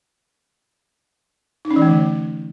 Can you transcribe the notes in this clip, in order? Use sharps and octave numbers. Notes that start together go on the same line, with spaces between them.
D#4
C#4
E3
A3
D3